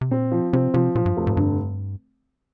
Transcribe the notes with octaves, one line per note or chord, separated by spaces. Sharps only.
C3
A#2 C4
F3
C3 C4
C3 F3
A#2 F3
G2
F1
G#2
G2 D3